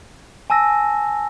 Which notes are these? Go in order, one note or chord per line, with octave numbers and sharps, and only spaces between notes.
G#5 A5 E6 A#6